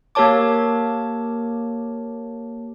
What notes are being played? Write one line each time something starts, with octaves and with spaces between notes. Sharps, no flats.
A#3 G4 A#4 C#5 A5 D6